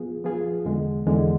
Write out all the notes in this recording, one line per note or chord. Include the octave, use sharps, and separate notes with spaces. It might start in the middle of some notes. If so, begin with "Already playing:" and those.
Already playing: F3 B3 F4 G#4
F3 B3 F4 G#4
E2 D3 G#3
E2 D3 G#3